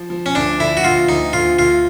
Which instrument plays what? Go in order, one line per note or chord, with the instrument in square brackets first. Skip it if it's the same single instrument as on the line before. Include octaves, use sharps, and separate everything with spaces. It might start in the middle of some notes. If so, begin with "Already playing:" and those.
Already playing: [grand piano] F3
F3
[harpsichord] C#4
[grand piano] D2 [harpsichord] D4
[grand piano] D3 [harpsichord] E4
[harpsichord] F#4
[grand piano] D2 [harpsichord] F4
[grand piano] D2 [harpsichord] D#4
[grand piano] D2 [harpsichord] F4
[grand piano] D2 [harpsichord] F4